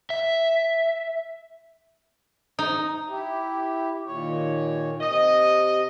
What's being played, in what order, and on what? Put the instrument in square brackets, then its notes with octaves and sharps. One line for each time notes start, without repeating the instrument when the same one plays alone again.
[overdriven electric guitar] E5
[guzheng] D#4
[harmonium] E4 G4
D#2 A#2 C#5
[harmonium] C3 [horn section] D#5